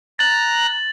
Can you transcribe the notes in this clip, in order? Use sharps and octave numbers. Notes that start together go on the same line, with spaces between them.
A#5 F#6 A6 F#7